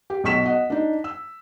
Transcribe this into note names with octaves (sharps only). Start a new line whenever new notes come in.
G4
B1 B2 C#6 B6 E7
D#5 F#5
D4 D#4
E6